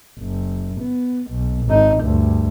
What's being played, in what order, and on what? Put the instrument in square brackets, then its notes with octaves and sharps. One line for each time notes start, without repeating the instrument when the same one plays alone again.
[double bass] F#1
B3
B1
G#1 D#4
D2 G2